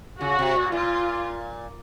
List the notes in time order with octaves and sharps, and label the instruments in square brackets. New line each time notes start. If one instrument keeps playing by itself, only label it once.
[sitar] C#3 [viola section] F#4
[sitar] C3
A#2
[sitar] A#2 [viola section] F4